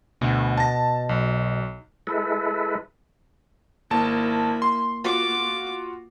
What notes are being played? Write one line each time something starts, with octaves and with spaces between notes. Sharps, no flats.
D2 B2
A5 A#6
B1
G#3 E4 A4 B4
G#1 A#3 E4 A5
C6
F4 F#4 D6